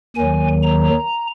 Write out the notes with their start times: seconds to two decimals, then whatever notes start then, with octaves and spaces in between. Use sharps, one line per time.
0.16 D#2 D#3 F#3 G#5
0.63 A#5